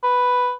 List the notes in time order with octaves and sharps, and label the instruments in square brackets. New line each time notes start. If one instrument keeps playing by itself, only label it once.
[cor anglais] B4